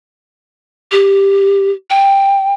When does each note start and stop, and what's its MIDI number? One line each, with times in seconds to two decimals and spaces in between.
0.92 1.71 67
1.90 2.54 79